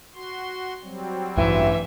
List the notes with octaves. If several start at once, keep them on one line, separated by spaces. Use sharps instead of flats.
F#4 C6
F#3 G3 C4
A1 G2 E3 E5